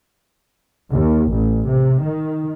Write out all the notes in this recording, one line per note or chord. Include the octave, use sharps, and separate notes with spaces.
D#2
A1
C3
D#3